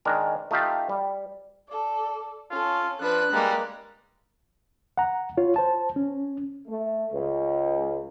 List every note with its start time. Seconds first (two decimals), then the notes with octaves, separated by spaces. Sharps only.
0.05 D#3 G#3 D4 A#4
0.51 A3 D#4 F4 G4 F5
0.89 G3
1.68 A4 D5
2.51 C#4 F4 A4
3.01 F3 D4 B4 F#6
3.32 G3 G#3 A#3
4.98 F#5 A#5
5.37 F4 C#5
5.56 C5 A5
5.96 C#4
6.67 A3
7.11 C#2